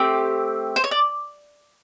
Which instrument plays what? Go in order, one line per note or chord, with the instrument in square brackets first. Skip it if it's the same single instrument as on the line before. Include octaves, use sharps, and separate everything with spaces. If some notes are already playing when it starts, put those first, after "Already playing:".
Already playing: [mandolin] A3 C4 G4
C5
C#5
D5